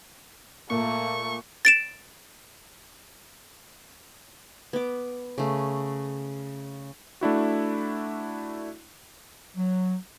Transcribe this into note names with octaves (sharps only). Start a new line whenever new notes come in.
A#2 A3 A#3 C#6
A6 D7 E7
B3 D6
C#3 A3
A3 D4 E4 F#4
F#3